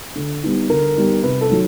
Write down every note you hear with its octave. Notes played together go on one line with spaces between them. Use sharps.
D3
G3 B3 D#4
D3 A#4
G3 B3 D#4
C3 B4
A4
D#3 F#3